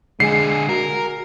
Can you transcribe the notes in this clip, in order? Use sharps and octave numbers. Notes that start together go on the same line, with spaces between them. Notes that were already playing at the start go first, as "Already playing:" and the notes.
D3 G#3 G#4 C7
F#4 A#4